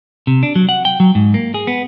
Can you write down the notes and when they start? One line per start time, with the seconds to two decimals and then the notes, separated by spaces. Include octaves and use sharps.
0.27 C3
0.43 D4
0.56 F#3
0.69 F#5
0.85 G5
1.00 F#3
1.15 G#2
1.34 A#3
1.54 G#4
1.67 B3